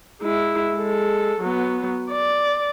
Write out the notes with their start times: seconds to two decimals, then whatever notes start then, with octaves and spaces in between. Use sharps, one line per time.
0.21 G#3 E4
0.75 G#3 A4
1.41 F#3 B3
2.11 D5